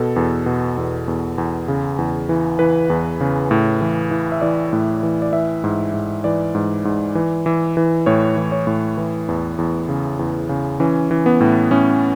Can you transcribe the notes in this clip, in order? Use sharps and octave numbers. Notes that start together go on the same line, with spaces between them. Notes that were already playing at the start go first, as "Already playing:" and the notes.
Already playing: B2 A4
E2
B2
E2
E2
E2
C#3
E2
E3
E3 B4
E2
C#3
A2
E3
E3
E5
E3 D5
A2
E3
D5
E3 E5
G#2
G#2
E3 D5
G#2
G#2
E3
E3
E3
A2 C#5
E3
C#5
A2
E3
E2
E2
C#3
E2
C#3
E3 C#4
E3
B3
A2
A2 C#4